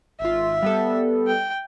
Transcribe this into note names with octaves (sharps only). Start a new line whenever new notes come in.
G#1 F4 E5
G3 B3 A4
G5